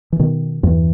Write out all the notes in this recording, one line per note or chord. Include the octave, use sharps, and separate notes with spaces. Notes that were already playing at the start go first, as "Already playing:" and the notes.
E3
B2 D#3
E2 G2 E3